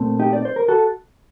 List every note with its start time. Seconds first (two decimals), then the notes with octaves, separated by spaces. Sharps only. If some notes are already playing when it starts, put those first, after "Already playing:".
Already playing: A#2 A3 C4
0.19 D#4 G4
0.33 D5
0.45 C5
0.56 A#4
0.68 F#4 A4